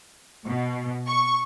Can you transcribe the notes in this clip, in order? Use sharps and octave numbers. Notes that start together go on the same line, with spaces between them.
B2
C#6